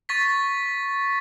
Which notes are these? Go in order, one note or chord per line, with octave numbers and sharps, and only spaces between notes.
C#6 A6 B6